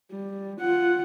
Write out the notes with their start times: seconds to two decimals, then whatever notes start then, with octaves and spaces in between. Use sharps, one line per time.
0.12 G3
0.61 F4 F#5